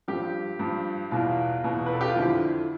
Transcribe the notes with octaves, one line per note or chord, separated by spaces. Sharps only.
G2 F3 G4
G2 F3
E2 B2 F4
E2 B2
B4
A4
G4
F4
F2 D3 F3 E4